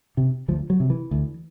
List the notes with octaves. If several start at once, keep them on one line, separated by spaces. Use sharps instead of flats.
C3
D2 F3
F#3
C3
E3
D2